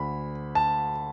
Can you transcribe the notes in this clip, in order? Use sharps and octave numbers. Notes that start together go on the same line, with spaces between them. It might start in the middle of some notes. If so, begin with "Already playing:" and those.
Already playing: D2 D3 B5
A5